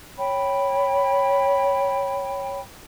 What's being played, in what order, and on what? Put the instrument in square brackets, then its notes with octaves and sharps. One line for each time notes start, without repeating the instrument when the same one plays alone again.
[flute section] C#5 G5 B5